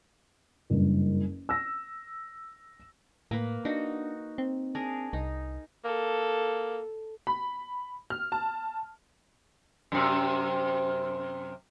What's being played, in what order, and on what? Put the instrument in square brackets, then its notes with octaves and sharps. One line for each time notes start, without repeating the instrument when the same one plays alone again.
[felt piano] F#1 G2
E6 A#6
[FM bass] A2 [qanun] A#3 B4
[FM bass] D4 [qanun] D#4 F#4
[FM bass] C4
[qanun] D4 G#4 A#4
[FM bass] C2 [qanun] D#4
[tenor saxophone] A#3 [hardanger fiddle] A4
[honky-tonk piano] B5
F6
A5
[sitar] F#2 C3